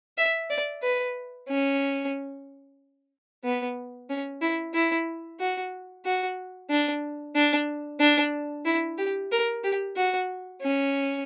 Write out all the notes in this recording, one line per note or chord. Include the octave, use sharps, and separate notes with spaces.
E5
D5
B4
C#4
B3
C#4
E4
E4
F#4
F#4
D4
D4
D4
E4
G4
A#4
G4
F#4
C#4